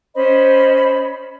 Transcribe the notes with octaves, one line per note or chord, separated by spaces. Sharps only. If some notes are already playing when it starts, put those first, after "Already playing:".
C#4 C5 D#5 B5